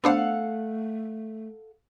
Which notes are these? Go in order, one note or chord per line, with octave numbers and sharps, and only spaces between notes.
A3 B3 D4 A4 C5 F5 F#5